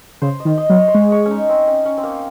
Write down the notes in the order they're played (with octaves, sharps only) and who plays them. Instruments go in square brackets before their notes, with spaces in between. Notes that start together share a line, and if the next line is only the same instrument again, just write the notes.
[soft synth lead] C#3 [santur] C5
[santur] D#5
[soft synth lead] D#3
[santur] D#5
[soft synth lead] F#3
[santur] C#5
C5
[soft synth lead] G#3 [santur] C#5
[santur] C#5
C#4
D#4
C4
C#4
C#4
C4
A#3